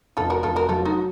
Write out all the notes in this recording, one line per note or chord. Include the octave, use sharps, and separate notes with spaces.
F1 F4 A4
F#4 A#4
F1 F4 A4
F#4 A#4
F#3 F4 A4
D#4 F#4